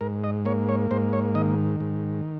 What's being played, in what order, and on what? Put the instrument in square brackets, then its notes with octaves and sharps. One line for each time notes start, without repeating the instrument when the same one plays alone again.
[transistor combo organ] G#2 A#4
D#5
A#3 C#5
C#5
G#2 C5
C#5
D#3 D#5
G#2